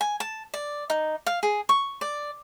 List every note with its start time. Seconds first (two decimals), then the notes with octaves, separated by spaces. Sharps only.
0.01 G#5
0.20 A5
0.54 D5
0.90 D#4
1.26 F5
1.43 G#4
1.69 C#6
2.01 D5